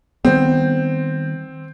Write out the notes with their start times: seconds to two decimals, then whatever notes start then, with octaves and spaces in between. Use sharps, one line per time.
0.25 D#3 G3 B3 C4